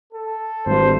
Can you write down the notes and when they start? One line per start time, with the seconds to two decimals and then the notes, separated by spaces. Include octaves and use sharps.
0.13 A4
0.66 G#1 G2 C5